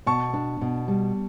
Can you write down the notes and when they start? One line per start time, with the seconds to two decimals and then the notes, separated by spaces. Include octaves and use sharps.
0.06 B2 A5 C#6
0.33 D4
0.61 B2
0.88 G3